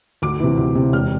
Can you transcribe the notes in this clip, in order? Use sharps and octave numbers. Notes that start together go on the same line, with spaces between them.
D2 D6
C3 E3
D2
C3 E3
E1 F6